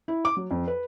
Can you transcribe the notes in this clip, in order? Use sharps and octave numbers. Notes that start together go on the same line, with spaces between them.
E4
D6
F#3
F2
B4